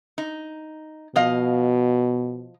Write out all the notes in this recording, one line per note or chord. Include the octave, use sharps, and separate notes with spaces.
D#4
B2 F3 D#5 F5